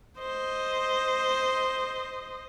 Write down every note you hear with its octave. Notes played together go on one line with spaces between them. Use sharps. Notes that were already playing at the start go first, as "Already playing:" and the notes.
C5 D#5